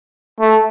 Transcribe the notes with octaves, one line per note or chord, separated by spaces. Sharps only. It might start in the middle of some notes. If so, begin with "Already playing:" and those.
A3